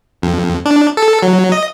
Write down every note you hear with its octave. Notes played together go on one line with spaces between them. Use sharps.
F2
D4
A4
F#3
D#5